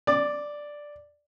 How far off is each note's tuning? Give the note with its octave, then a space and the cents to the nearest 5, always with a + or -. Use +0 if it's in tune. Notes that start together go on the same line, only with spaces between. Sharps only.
D5 +0 D6 +35